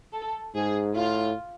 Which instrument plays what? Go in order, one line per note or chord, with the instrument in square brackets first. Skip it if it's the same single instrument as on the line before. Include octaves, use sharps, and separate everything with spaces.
[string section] A4
[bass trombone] G#2 [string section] G#4
[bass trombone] A2 [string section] F4